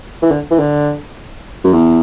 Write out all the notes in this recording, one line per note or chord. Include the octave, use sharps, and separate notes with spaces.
E3
D3
E3
D3
F#2
E2